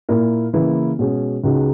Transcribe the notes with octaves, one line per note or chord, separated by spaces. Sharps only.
A#2 A#3 E4 A#4
C#3 E3 A#3 E4 B4
B2 G#3 C#4 G#4
C#2 C#3 G#3 D#4 F#4